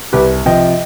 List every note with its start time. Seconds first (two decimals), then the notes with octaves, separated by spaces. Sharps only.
0.13 C2 G4 B4
0.46 C3 F3 D#5 G5